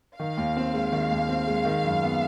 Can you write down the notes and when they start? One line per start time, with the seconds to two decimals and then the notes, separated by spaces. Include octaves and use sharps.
0.19 D#3 F5
0.37 D#2
0.57 C4
0.74 G#3
0.92 D#3
1.11 D#2
1.29 C4
1.47 G#3
1.65 D#3
1.84 F#2
2.02 B3